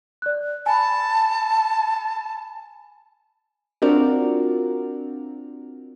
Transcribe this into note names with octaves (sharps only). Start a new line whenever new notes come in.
D5 F#6
G#5 A5 B5
C4 D4 F4 F#4 A#4 D5